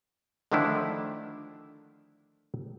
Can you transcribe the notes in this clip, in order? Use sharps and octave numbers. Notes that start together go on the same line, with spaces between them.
D3 D#3 F3 A3 D4 E4